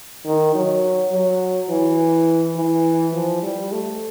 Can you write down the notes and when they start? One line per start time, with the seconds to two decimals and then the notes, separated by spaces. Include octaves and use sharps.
0.26 D#3
0.55 F#3
1.12 F#3
1.69 E3
2.56 E3
3.14 F3
3.43 G3
3.72 A3